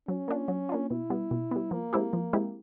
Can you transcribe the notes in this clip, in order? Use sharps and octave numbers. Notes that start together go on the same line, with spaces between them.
F#3 C#4
A#3 D4 F4
F#3
A#3 D4 F4
B2 E4
G3 B3
B2
G3 B3
F3 A#3
G#3 C4 E4 G4
F3
G#3 C4 E4 G4